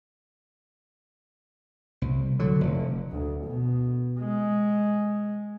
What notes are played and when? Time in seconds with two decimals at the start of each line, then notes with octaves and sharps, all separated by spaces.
2.02 C2
2.39 D3 F#3
2.61 F1
3.11 D2
3.45 B2
4.19 G#3